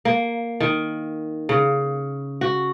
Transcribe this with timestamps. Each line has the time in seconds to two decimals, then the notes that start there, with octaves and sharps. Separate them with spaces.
0.05 A#3
0.60 D#3
1.49 C#3
2.41 F#4